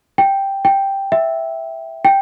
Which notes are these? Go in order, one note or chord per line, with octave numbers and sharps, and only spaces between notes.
G5
G5
E5
G5